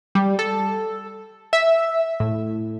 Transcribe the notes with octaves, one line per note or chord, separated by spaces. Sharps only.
G3
A4
E5
A2